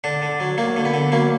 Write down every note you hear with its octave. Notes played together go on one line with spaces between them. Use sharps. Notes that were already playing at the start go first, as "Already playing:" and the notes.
D3 D4
D3
F#3
F#3 A#3
D3
B3
D3
F#3 A#3